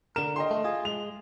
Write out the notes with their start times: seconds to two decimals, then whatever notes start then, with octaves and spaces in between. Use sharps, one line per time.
0.16 D3 A#4 E7
0.36 D#5 G5 C6
0.51 A3
0.64 F4 G#4
0.85 G#3 F7